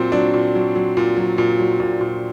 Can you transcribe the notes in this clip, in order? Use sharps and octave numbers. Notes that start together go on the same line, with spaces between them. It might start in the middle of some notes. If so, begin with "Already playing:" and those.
Already playing: A#2 F#3 C4
F#3 D4
A#2
F#3
F#3
A#2
F#3
A#2
F#3
A#2
A#2